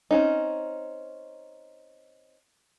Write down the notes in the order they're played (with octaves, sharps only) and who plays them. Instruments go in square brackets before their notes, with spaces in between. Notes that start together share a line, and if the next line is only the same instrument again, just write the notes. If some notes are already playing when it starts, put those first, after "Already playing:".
[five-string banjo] C4 C#4 D#4